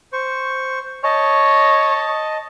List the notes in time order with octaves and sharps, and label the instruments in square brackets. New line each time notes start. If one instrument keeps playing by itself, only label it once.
[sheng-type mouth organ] C5 C#6
[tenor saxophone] C#5 [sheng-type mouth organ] D#5 A5